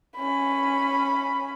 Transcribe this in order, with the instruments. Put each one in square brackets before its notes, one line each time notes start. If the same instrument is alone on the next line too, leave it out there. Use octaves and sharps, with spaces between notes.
[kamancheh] C#4 B5